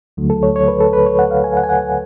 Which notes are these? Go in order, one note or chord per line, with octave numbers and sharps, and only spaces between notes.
D2 D3 F#3 A3
A4
C#5
C#5
B4
A4
B4
C#5
F#5
F5
G#5
F#5
G#5
F#5
F#5